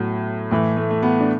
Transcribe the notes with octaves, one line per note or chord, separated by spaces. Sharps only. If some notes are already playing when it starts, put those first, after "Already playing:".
Already playing: A2 F#3 B3
A2 E3 A3
A3
A3
B3
D4